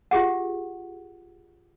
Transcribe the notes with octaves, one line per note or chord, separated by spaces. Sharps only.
F4 G4 G#4 F#5